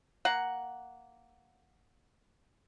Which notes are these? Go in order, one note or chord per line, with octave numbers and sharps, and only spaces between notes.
A#3 F#5